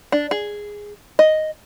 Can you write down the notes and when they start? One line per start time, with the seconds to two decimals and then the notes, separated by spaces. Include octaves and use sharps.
0.12 D4
0.31 G#4
1.19 D#5